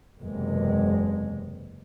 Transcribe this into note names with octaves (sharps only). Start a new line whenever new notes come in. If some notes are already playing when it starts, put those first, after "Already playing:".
F#1 E2 C3 G#3